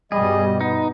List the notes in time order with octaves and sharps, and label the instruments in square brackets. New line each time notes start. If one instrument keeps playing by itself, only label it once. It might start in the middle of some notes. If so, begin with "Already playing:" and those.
[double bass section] G2 B2 [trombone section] G3 [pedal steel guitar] G#4 [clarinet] D#5
[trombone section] B3 [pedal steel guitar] D#4